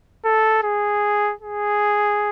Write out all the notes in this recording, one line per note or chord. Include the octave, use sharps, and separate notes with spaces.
A4
G#4
G#4